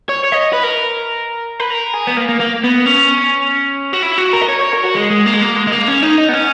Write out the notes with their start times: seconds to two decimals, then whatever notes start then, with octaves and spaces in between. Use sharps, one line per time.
0.09 C#5
0.24 C#5
0.32 D#5
0.53 B4
0.63 A#4
1.60 B4
1.71 A#4
1.94 G#4
2.07 B3
2.17 A#3
2.29 A#3
2.40 A#3
2.64 B3
2.86 C#4
3.93 F#4
4.02 E4
4.18 F#4
4.33 A#4
4.41 D#5
4.48 C#5
4.60 C#5
4.72 A#4
4.84 F#4
4.95 G#3
5.10 G#3
5.26 A#3
5.34 G#3
5.42 A#3
5.56 G#3
5.67 G#3
5.72 A#3
5.88 C#4
6.03 D#4
6.18 D#4
6.29 B3
6.33 C#4